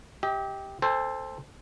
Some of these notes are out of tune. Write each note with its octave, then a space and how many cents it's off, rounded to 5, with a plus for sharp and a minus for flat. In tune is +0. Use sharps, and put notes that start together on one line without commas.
G4 +0 D#5 +45
A4 +5 C5 +0 G#5 -45